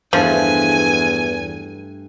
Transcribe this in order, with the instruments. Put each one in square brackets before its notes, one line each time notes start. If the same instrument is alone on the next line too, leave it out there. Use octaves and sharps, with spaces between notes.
[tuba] E2 [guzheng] G2 A3 [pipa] F3 [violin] G#5